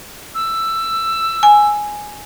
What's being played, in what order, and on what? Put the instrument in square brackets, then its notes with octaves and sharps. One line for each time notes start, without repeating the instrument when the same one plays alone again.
[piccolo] E6
[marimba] G#5